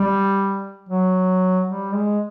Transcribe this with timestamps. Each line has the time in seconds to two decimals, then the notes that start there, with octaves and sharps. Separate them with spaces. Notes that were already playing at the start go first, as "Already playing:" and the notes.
Already playing: G3
0.89 F#3
1.67 G3
1.93 G#3